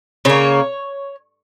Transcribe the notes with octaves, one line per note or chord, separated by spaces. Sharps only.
C#3 A#3 C#5